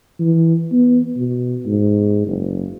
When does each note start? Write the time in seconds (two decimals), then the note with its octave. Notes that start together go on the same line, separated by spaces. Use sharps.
0.19 E3
0.72 B3
1.17 B2
1.66 G#2
2.27 F#1